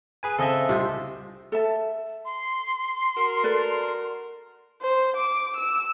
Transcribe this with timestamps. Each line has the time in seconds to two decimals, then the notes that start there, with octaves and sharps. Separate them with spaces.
0.23 G#4 B4 G#5
0.39 C#3 C4 A4 D#5 E5
0.69 C2 C3 F4 C5
1.52 A4 E5 A5
2.25 C6
3.17 F#4 A#4
3.44 A4 B4 D5
4.81 C5
5.17 D6
5.57 E6